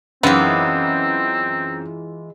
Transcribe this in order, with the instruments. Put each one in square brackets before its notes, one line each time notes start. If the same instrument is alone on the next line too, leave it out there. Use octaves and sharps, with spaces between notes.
[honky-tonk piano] F#2 [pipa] D#3 B3 [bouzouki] E3 G#3 F4 [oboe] C4